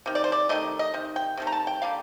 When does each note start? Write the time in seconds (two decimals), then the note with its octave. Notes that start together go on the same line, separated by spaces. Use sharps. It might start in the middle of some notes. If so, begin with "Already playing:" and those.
0.06 C3 D#3
0.15 D5
0.24 C5
0.32 D5
0.49 C3 D#3 A3 D#5
0.79 D#5
0.94 C3 D#3
1.16 G5
1.37 C3 D#3 A3
1.47 A#5
1.52 A5
1.67 G5
1.82 D3 G3 A#3 F5